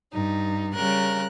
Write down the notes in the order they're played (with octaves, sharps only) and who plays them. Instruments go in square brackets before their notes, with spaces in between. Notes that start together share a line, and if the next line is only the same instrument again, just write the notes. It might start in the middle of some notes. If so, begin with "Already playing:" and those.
[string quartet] G2 D#4
C#3 G3 A#4 F#6